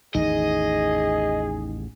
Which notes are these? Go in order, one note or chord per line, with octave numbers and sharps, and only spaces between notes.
A1 E2 D#3 D#4 G#4 D#5